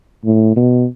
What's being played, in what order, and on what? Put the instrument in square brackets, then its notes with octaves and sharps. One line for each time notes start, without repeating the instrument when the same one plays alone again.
[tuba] A2
B2